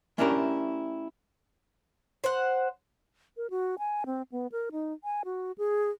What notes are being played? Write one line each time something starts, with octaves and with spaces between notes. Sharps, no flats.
A3 C#4 D4 E4 G4 A#4
C5 F#5
A#4
F#4
G#5
C4
B3
A#4
D#4
G#5
F#4
G#4